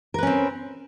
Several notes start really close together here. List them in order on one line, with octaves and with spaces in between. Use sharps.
A#4 B4 C#4 C4